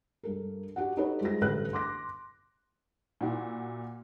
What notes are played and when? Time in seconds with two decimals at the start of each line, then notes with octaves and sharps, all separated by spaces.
0.23 G2 A4 A#4
0.76 D4 F#4 G4 F#5
0.97 D#4 F#4 G4 A4 B4 C#5
1.21 G3 G#3 F4 C5 A#6
1.41 A1 G2 D3 A4 B4 F#6
1.73 C6 D6 A#6
3.21 A#2 E4 F#4